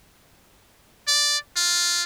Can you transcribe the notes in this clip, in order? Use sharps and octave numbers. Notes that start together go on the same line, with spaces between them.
D5
F4